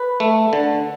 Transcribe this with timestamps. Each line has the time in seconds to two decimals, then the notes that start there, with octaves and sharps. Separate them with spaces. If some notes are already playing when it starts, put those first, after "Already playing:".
Already playing: B4
0.20 A3
0.53 D3